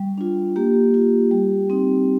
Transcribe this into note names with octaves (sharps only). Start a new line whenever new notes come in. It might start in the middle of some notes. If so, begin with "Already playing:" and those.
Already playing: G3
D4 F4
A#3 G4
F4
G3
C4 D#4